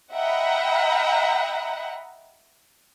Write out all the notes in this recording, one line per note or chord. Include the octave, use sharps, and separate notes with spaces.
D#5 E5 F#5 G5 A#5 B5